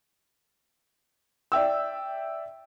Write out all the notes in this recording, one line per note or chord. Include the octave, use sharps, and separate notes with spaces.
D5 E5 G5 E6